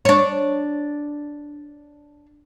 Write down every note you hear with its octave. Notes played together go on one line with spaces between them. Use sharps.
D4 C#5